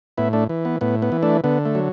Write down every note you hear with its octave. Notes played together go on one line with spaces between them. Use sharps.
A2 B3 E4
A3 D4
E3
B3
A2 B3
B3
E3
A3 D4
D3 B3
A3
F#3